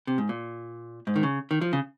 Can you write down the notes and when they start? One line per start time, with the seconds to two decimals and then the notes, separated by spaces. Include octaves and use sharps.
0.07 C3
0.18 G#2
0.29 A#2
1.07 G#2
1.16 D#3
1.23 C#3
1.51 D#3
1.61 F3
1.73 C#3